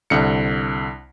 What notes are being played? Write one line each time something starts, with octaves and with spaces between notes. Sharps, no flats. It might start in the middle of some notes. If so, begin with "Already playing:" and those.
C2 D3 C#7